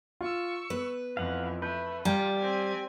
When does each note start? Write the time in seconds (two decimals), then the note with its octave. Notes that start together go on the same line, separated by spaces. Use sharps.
0.21 F4 C#6 E6
0.70 B3 B4
1.17 F2 E3 F3 F5 F#5
1.62 A3 B4 G6
2.05 G3 F4 G4 G5 A#5 G#6
2.39 C4 G#5